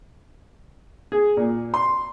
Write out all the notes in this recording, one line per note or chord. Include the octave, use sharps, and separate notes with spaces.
G#4
A#2
C6